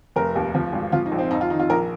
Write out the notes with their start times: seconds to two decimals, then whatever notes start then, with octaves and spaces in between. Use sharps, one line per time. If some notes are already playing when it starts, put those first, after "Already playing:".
0.16 F1 A#4
0.36 D#2
0.54 F3
0.73 G#1
0.92 F3 F4
1.06 D#4
1.12 A#1
1.18 C4
1.31 F2 D#4
1.41 F4
1.50 D#3 D#4
1.59 F4
1.70 A#1 A#4